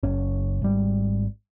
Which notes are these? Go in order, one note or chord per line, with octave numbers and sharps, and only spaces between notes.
F#1 C#4
G#1 G3